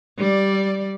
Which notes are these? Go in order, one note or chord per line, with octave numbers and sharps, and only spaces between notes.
G3 D5